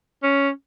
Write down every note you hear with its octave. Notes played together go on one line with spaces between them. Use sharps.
C#4